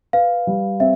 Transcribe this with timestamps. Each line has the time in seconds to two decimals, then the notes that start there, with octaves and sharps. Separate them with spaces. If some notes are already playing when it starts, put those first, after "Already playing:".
0.13 B4 F5
0.47 G3
0.80 C4 E5